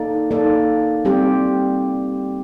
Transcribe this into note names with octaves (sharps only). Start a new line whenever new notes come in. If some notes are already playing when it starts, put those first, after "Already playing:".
Already playing: A#3 D#4 A4 D5
A#3 D#4 A4 D5
G3 C4 G4